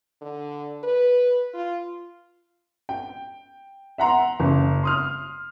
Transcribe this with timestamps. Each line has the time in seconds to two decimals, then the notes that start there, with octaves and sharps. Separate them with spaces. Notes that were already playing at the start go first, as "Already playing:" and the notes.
0.22 D3
0.84 B4
1.54 F4
2.89 G5
3.98 E5 F#5 A#5 C6
4.40 F#1 C#3
4.83 C6 D#6 F6